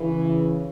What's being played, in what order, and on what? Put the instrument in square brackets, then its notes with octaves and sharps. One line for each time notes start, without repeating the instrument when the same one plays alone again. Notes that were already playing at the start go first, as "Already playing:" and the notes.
Already playing: [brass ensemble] C#3 E3